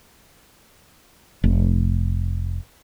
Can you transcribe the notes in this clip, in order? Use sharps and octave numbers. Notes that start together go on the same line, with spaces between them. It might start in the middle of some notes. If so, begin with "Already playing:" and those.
F1